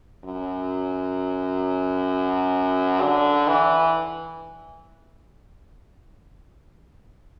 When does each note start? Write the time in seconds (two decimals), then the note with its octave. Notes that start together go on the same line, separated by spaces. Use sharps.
0.24 F#2
3.01 D3
3.47 E3